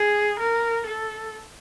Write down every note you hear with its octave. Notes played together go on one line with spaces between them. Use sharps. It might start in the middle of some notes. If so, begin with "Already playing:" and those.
Already playing: G#4
A#4
A4